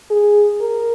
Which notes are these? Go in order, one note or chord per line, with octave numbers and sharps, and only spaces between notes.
G#4
A#4